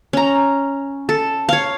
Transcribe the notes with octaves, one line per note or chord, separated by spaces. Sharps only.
C#4 A#5
A4
C#5 F5